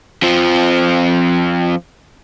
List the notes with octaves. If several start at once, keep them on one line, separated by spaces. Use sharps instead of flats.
F2 F3